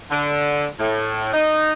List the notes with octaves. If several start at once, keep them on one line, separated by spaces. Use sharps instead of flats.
D3
A2
D#4